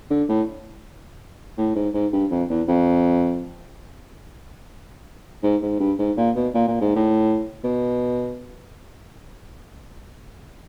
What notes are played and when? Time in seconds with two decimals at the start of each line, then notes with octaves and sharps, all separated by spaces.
0.10 D3
0.29 A2
1.58 A2
1.76 G#2
1.94 G#2
2.13 G2
2.31 F2
2.50 E2
2.68 F2
5.43 G#2
5.62 G#2
5.80 G2
5.99 G#2
6.17 A#2
6.36 B2
6.54 A#2
6.68 A#2
6.81 G#2
6.96 A2
7.64 B2